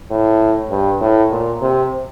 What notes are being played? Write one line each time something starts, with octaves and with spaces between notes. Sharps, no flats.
A2
G2
A2
A#2
C3